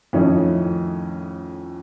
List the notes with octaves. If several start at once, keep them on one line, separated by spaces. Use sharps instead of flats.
F2 A2 D#3 A3 C#4 D#4